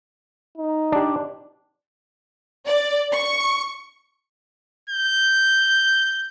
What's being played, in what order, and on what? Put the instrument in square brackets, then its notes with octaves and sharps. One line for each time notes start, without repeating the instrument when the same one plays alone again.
[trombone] D#4
[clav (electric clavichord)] D4 G4
[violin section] D5
C#6
[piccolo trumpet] G6